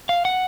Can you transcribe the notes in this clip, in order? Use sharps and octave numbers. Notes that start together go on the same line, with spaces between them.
F5
F#5